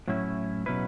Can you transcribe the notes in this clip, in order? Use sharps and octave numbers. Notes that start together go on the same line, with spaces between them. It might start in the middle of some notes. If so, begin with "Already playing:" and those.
A2 F#3 C#4 E4
B2 F#3 C#4 E4 B4